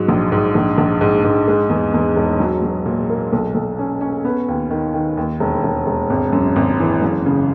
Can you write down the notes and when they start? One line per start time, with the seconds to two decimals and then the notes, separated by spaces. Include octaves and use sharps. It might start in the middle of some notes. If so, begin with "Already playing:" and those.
Already playing: G#2 F#3
0.08 A#1
0.32 G#2
0.55 A#1
0.78 A#1
1.01 G#2
1.24 G#2
1.48 G#3
1.70 E2
1.94 E2
2.16 E1
2.40 F#3
2.62 F#3
2.85 A#2
3.09 A#3
3.33 B1
3.55 B1
3.79 C#4
4.01 C#4
4.25 B3
4.48 D#2
4.70 D#3
4.94 D#3
5.17 D#2
5.40 E1
5.64 E1
5.87 E1
6.10 G#1
6.33 F#2
6.56 G#1
6.79 E3
7.02 F#1
7.26 C#3